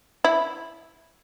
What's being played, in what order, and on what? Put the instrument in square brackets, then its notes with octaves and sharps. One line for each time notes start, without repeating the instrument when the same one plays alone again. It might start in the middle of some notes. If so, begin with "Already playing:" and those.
[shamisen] E4